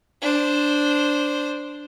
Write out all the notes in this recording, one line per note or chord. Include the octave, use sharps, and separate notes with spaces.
D4 C5